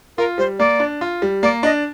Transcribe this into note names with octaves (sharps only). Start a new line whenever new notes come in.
F4 A#4
G3 C5
A#3 D5
D4
F4
G3
A#3 D5
D4 D#5